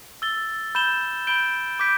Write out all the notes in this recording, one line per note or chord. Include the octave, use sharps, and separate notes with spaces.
E6 A6 G7
B5 G6 E7 G7
B5 G6 D7 G7
D6 G6 B6 D7